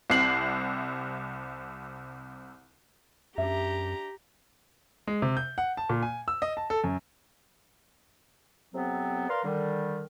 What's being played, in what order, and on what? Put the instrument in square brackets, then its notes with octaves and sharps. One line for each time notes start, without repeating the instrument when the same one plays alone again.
[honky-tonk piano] C2 C3 C7 F#7
[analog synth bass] F#2 [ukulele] D4 E5 [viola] G4 A#5
[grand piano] G#3
C3
G6
F#5
A5
A#2
G#5
E6
D#5
A5
A4
F#2
[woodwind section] F2 C3 F#3 B3 C4
A#4 B4 D5 F5 A#5 C6
D3 D#3 G3